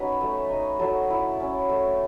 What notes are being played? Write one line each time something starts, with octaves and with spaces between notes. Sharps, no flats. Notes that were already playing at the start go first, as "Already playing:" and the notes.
Already playing: F#3 C#4 D#4 B4 C#5
A3
D#4
F#3 A4
E4
C#4
A3